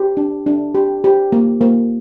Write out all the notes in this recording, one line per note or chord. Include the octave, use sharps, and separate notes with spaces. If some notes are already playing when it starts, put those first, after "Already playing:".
Already playing: G4
D4
D4
G4
G4
A#3
A#3